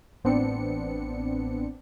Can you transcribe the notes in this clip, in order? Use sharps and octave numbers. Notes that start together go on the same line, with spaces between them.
A1 B3 C4 D4 C#7